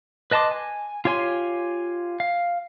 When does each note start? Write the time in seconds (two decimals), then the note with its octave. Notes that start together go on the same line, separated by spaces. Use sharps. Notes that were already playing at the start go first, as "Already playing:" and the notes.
0.31 B4 D#5 A5 C6 D6
0.51 G#5
1.05 F4 G4 C#5 G#5 C6
2.20 F5